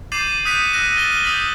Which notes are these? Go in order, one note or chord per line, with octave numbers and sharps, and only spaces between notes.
D6 G6 A6 C7 D#7 F#7
D#6 F#6 G6 B6 C#7 D#7
E6 F#6 A#6 D#7
F6 A6 A#6 D#7 E7 G7
D#7
D#6 F6 G6 A6 B6 F#7